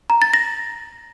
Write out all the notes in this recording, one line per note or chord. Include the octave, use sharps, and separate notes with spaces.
A#5
A6
A#6